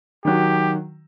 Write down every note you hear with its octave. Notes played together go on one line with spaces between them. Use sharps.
D#3 F#3 G4